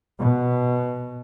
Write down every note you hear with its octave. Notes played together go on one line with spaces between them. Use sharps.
B2